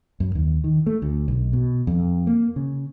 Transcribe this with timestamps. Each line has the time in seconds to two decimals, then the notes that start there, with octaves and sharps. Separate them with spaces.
0.20 F#2
0.35 D#2
0.64 D#3
0.86 A3
1.02 D2
1.28 B1
1.53 B2
1.87 F2
2.27 A#3
2.56 C#3